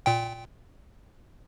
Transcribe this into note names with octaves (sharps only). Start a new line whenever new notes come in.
A#2 G5